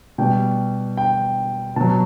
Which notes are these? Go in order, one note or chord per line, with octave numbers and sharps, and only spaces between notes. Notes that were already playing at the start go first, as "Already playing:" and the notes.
B2 G3 G5
G5
B2 F#3 A5